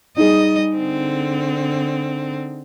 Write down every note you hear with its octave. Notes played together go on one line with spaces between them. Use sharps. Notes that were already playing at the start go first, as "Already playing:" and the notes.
G3 D#4 G#4 D#5
D3 C4